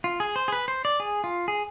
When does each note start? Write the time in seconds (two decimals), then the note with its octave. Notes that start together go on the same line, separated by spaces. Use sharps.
0.04 F4
0.20 G#4
0.36 C5
0.48 G#4
0.52 B4
0.68 C5
0.85 D5
1.00 G#4
1.24 F4
1.48 G#4